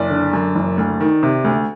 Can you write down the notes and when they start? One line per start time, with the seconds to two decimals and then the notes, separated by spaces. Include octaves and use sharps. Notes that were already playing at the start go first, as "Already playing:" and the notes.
Already playing: F#1 D5
0.10 D3
0.33 F#2
0.55 F#1
0.78 D2
1.00 D#3
1.23 C3
1.44 D2